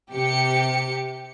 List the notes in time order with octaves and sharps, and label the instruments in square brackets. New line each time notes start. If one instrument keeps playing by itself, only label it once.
[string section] C3 G4 C#7